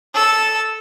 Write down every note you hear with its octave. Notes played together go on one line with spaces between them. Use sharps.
A4 E6